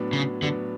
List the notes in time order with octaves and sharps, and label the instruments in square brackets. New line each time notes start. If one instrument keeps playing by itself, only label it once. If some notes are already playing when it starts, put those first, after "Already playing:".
Already playing: [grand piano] A2 F#3 B3 D4
[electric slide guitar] C#3
[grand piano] A2 F#3 B3 D4 [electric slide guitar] D3